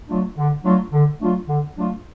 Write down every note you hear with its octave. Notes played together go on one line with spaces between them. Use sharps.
F#3 A3 D4 F4
D3
F#3 A3 D4 F4
D3
F#3 A3 D4 F4
D3
F#3 A3 D4 F4